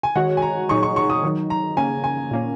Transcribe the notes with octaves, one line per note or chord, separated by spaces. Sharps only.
G#5
D#3 G#3 F#4 C#5 F#5
G#5
A#5
A#2 F#3 D#4 G#4 C#5 C#6
C#6
C#6
D#6
D#3 F#3 D#4
A#5
C#3 A#3 C#4 G#5
G#5
A#2 A#3 C#4